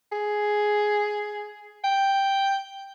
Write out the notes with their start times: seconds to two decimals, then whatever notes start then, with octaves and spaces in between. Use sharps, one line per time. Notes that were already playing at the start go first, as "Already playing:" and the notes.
0.12 G#4
1.84 G5